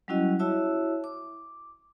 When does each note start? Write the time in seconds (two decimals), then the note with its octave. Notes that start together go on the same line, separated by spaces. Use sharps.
0.08 F#3 G3 C#4 E4 F#4 D#5
0.39 E4 F#4 C#5 E5 A5 E6
1.04 D6